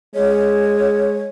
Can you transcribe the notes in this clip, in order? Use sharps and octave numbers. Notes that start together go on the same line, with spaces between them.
G#3 C#5